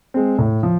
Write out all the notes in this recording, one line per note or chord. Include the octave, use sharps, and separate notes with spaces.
G#3 C4
A2
F3